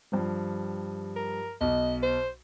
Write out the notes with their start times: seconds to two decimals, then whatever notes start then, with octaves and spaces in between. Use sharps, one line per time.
0.12 G2 F3 G3
1.16 A#4
1.61 B1 D#5
2.03 C5